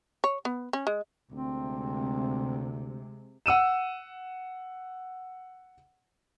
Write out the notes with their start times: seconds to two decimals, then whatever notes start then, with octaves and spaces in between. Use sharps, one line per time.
0.24 C#5
0.45 B3
0.73 C#4
0.87 G#3
1.32 D2 C3 G#3 C4
3.46 F#5 E6 D#7 E7